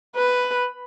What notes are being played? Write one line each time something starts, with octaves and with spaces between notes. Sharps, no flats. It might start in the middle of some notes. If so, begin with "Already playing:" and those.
B4